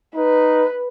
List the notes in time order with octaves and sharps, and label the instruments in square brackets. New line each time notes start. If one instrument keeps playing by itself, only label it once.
[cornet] D#4 [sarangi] B4